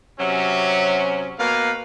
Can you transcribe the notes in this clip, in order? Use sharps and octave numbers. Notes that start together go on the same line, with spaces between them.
C3 F#3 C#4
B2 A#3 B4 F5